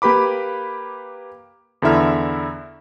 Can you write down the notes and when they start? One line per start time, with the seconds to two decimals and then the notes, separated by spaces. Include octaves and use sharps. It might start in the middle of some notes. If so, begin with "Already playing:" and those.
0.02 A#3 G4 B4 B5 D6
1.82 E2 D3 E4 E5 F6